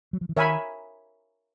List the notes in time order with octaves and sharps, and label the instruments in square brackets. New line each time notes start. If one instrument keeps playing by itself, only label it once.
[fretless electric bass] F#3
F3
E3
[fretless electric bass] D#3 [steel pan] A#4 C#5 E5 G#5 B5